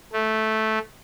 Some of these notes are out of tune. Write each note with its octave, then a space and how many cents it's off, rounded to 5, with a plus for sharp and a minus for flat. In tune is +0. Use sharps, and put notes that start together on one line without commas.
A3 -10